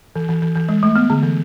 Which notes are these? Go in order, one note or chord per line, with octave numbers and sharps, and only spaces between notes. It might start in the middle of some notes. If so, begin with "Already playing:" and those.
E3
E3
E3
E3
G#3
A3
B3
D3
E3